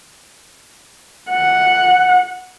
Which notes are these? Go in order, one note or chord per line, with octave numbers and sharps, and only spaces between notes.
F#5